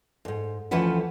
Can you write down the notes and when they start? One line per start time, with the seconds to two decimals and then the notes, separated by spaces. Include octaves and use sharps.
0.25 F2 G#2
0.71 D2 E3 F3 C#4 B4 F#5